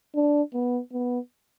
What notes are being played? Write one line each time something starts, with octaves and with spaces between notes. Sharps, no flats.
D4
B3
B3